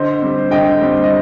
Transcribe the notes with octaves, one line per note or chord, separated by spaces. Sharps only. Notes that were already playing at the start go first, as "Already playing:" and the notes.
Already playing: D3 C5 D#5
G3 C4
D3 D#5 G5
G3 C4
D#5